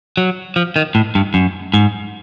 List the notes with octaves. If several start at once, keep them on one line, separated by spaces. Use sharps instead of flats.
F#3
F3
D#3
A2
G2
F#2
G#2